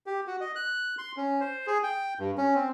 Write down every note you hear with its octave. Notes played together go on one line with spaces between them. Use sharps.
G4
F#4
D#5
F#6
C6
C#4
C5
G#4
G5
G2
C#4
C4